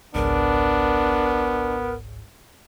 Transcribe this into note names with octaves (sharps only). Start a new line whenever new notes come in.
G#1 C#2 G#2 B3 D4 A#4